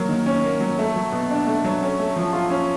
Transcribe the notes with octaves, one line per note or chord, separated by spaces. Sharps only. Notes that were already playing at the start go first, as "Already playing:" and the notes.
Already playing: F#3 A#3
D#3
C#4
A#3
F#3
A3
F#3
B2
D4
A3
F#3
C#4
A3
F3
F4
C#4